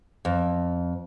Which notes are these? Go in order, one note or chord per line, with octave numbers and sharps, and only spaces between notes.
F2